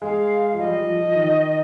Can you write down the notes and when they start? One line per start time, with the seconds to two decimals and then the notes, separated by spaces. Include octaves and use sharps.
0.02 G#3 F5
0.54 F3
0.59 G3 D#5
0.78 F3
0.97 F3
1.15 D#3